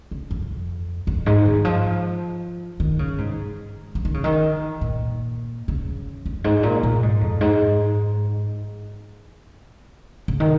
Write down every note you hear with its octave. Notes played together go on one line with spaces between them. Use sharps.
C#3
F2
F2
G#2
D#3
F3
D#3
C#3
G#2
F3
D#3
C#3
D#3
A#2
C#3
F2
G#2
A#2
A#2
G#2
F2
G#2
C#3
D#3